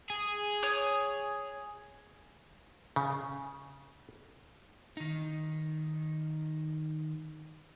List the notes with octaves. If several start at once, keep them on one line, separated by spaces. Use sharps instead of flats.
G#4
C#5 D#6
C#3
D#3 D#4